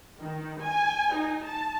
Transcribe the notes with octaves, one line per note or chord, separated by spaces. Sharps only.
D#3
G#5
D#4
A5